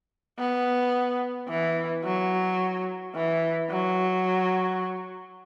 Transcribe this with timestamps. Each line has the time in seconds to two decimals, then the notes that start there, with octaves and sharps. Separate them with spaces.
0.39 B3
1.48 E3
2.04 F#3
3.15 E3
3.70 F#3